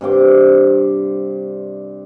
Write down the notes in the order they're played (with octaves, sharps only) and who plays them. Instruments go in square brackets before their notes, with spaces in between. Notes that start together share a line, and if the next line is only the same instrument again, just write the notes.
[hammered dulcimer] G2 C3 G5 D6